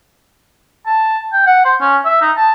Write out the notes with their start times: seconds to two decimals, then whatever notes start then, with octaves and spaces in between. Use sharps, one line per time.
0.87 A5
1.33 G5
1.47 F#5
1.65 C5
1.81 C#4
2.05 E5
2.21 D#4
2.37 A5